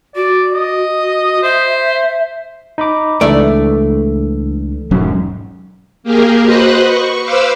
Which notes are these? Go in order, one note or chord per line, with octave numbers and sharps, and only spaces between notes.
F#4 D5
D#5
C5 E5
D#4 B5 D6
C#2 E3 A3 D4 D5
E1 G#2 F#3 C#4
A#3 G4 G#4 A#4
F#4 B4 C5 D#5 F#5 F#6
C#6
B4 C5 F5 D6 E6